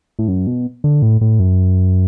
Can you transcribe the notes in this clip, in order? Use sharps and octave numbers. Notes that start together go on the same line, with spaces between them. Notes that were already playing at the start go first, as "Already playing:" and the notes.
A2
F#2
B2
D3
A2
A2
F#2